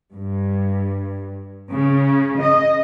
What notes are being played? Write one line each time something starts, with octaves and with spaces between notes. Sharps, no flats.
G2
C#3
D#5